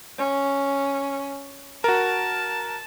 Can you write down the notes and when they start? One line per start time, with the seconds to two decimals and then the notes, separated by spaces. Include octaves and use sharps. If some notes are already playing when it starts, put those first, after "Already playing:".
0.18 C#4
1.84 F#4 A#4 A5